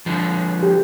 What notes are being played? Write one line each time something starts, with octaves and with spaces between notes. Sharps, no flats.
D3 F3
G4